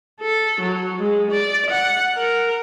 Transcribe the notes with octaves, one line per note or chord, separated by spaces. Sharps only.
A4
F#3
G#3
D5
F#5
A#4